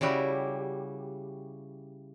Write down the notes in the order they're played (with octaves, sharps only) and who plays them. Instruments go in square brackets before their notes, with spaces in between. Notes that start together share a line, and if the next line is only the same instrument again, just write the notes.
[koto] C#3 G3 E4 F#4 G4